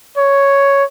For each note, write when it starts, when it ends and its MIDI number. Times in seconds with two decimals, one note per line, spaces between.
0.18 0.84 73